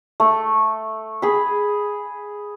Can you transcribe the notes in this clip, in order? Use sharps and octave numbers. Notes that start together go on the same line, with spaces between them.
A3
G#4 B5